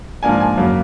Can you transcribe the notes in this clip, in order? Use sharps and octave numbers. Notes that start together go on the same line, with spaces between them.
G#2 F3 A#3 D4 G#5
G#5
F#2 C#3 F#3 A#3